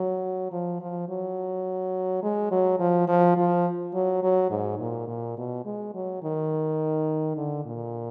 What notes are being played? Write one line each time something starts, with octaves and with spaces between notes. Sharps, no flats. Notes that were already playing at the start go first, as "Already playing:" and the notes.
Already playing: F#3
F3
F3
F#3
G#3
F#3
F3
F3
F3
F#3
F#3
G#2
A#2
A#2
B2
G#3
F#3
D#3
D3
A#2